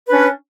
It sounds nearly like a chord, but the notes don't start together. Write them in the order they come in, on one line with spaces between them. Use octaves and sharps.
B4 D4 C#4